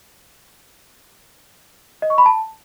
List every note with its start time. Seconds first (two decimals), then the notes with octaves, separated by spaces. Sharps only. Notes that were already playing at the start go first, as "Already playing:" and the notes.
2.02 D#5
2.10 C#6
2.18 B5
2.26 A5